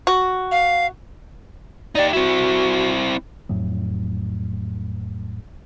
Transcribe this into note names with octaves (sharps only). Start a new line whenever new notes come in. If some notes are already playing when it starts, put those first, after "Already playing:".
F#4
F5
D#4 G4 D5
C4 E4 F#4
F2 A2 F#3